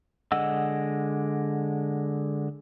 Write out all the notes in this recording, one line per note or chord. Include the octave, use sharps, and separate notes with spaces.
D3 G#3 D#5 F#5 E6